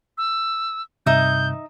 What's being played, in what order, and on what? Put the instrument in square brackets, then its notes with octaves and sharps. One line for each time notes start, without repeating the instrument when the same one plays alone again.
[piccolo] E6
[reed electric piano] G2 C3 [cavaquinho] D#4 E5 D#6 [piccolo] G6